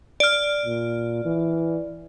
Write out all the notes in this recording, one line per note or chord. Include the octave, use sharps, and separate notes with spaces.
D5 F6
A#2
E3